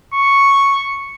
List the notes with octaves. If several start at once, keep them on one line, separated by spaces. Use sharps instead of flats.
C#6